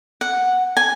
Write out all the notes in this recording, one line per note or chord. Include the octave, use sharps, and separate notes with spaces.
F#5
G#5